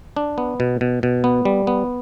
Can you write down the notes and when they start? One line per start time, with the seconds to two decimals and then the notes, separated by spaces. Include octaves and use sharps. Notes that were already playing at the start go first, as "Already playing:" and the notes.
0.17 D4
0.38 B3
0.60 B2
0.81 B2
1.03 B2
1.24 B3
1.45 G3
1.67 B3